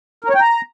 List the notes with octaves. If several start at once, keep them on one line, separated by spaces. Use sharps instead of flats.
A#4
C#5
G5
A#5